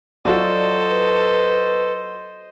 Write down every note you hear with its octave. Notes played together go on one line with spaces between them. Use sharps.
F#3 F4 F#4 A4 C5 D5 D#5
B4